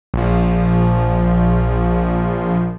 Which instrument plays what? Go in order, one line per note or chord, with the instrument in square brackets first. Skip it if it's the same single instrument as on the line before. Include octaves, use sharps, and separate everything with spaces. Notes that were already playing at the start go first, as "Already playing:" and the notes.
[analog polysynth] A#1 F3